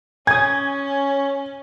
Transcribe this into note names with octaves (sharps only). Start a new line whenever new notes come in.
C#4 G#5 D#6 G#6